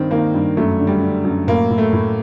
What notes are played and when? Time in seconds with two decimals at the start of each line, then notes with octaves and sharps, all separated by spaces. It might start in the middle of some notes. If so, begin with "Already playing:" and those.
Already playing: G2 D#3 C4
0.11 D#3 A#3
0.34 G2
0.57 F#2 A3
0.79 D3
0.87 G3
1.01 D3
1.24 F#2
1.47 A2 A#3
1.70 A2
1.78 A3
1.93 A2